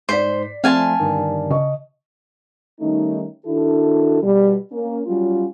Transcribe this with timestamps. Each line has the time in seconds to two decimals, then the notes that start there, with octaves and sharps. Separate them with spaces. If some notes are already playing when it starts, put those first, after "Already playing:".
0.09 G#2 C5 D5 B6 C7
0.64 F3 A3 C4 F5 G#5 A5 C6
1.00 G1 G2 D#3
1.51 C#3 D#5 C#6
2.80 D#3 G3 A3 C#4 D#4
3.45 D#3 D4 E4 F#4 A4
4.22 B2 G3
4.72 A#3 C#4
5.06 F#3 G3 C#4 F4